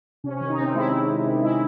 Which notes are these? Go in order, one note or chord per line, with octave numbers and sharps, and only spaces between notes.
C3 C#4
C#4
D#3
D#4
C3 C4
G#3 E4
C3
D#3
C3
G#3 E4